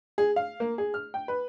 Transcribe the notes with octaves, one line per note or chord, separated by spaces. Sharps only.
G#4
F5
A#3
G#4
F6
G5
B4